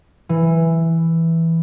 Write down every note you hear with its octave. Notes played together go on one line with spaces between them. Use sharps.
E3